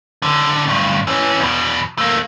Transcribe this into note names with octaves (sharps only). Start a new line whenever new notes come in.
C#2 D3
D2 G2
E3 C#4
E2 B2
A3 A#3